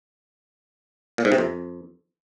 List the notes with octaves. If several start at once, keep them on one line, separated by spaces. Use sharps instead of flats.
A#2
G#2
C3
F2